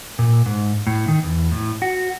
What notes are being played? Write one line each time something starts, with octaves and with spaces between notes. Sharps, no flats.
A#2
G#2
A2
D#3
E2
A2
F#4